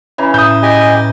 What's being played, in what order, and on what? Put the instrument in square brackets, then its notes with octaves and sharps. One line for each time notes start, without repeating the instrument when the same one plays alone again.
[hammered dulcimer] C#3 E3 A#5
[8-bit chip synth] A2 [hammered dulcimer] E5 [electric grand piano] D#6 G6
[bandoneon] G4 D#5 G#5